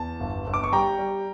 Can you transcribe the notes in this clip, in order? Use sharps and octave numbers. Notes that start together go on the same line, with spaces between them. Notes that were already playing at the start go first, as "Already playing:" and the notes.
Already playing: E2 A5
G1
G1
D6
C#6
G3 G5 A#5
G3